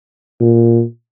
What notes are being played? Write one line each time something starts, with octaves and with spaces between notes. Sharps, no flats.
A#2